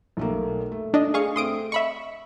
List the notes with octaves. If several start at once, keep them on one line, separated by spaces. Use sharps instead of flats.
B1 A3 A#3
A3
D4 D#5
G#4 F5 C#6
A3 C4 C6 D#6 D7
D#5 E5 B5 C#6